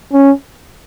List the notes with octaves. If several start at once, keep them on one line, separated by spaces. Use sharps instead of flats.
C#4